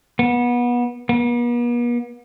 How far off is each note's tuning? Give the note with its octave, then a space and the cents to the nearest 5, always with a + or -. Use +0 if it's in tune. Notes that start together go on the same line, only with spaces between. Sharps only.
B3 -25
B3 -45